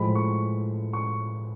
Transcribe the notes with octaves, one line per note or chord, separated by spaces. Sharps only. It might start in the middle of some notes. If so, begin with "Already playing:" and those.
Already playing: A2 F3 G#3 B5
C#6
C#6